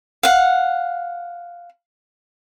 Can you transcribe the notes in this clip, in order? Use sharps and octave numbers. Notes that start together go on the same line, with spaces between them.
F5 F#5